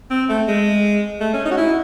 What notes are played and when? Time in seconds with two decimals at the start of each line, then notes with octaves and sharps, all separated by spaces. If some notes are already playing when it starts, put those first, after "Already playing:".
0.11 C4
0.29 A3
0.48 G#3
1.21 A3
1.33 C#4
1.45 D#4
1.51 F#4
1.57 E4